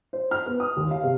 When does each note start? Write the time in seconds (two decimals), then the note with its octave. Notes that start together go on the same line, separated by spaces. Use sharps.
0.13 C5
0.31 F6
0.46 B3
0.60 D#6
0.76 D#2
0.91 F5
1.03 C3